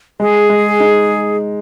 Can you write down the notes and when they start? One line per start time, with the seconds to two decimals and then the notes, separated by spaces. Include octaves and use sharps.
0.20 G#3 G#4
0.50 G#3
0.80 D#4